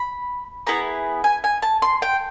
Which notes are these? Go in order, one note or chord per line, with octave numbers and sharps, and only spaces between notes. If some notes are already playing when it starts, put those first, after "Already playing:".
Already playing: B5
B3 E4 G#4 A#5
G#5
G#5
A5
C6
G5